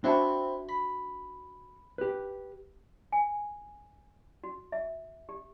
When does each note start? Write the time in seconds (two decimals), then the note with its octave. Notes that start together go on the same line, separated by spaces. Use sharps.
0.04 C4 D4 E4 F#4 A5
0.69 B5
1.98 G4 B4
3.12 G#5
4.44 F#4
4.72 E5
5.29 G4